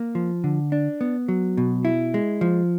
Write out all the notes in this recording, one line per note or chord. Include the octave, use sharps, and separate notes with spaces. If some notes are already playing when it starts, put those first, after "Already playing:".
Already playing: A#3
F3
D3
D4
B3
F#3
B2
E4
G#3
F3